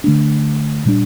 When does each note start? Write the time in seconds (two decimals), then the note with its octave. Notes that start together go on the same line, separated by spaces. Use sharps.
0.04 D3 A3 D4
0.85 A#2 G3 D4